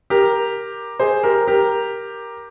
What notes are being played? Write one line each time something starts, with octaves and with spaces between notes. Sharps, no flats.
G4 A#4
G#4 C5
G4 A#4
G4 A#4